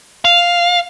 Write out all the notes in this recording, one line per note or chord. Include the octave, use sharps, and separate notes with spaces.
F5